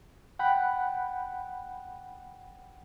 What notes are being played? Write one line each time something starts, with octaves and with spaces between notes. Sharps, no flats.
F#5 G5 B5 F#6